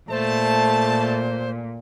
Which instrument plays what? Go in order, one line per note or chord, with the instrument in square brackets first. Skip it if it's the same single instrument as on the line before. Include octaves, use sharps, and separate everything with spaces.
[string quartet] A#2 [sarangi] A3 [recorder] C5 [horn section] A5